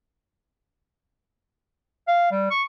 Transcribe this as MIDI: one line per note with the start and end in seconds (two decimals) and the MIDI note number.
2.07 2.30 77
2.31 2.50 55
2.50 2.63 85